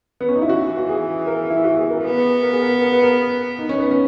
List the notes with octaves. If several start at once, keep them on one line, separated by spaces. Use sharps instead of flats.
B3
C#4
D#4
E4
E3 F#4
F#4
G#4
A#4
E4
F#4
G#4
A#4
B3 B4
A#4
G#4
A#4
A#4
B4
A#4
D#4
C#4
B3
C#4